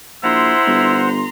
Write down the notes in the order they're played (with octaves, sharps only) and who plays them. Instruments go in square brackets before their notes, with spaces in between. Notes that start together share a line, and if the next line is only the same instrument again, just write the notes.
[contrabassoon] A#1 [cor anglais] E4 [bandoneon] C5 F#5 [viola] A#5 C6
[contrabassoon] G1